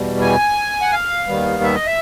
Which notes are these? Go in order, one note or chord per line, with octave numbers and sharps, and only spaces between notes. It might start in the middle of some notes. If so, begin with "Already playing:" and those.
Already playing: E2 B2 G3
G#5
F#5
F5
D#2 D#3 G3 B3
E5
D#5
E5